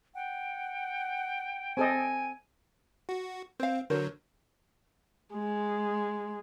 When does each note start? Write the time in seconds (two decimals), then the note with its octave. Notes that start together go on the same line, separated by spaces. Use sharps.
0.15 F#5 G5
1.77 C4 A4 D#5 G#5
3.09 F#4
3.60 C4 C5 F5
3.90 D3 F#3 A#4 C5 C#5
5.34 G#3